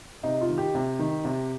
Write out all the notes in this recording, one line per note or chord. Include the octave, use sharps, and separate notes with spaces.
C3 D#4
F4
D#3
G4
C3
D#3
C3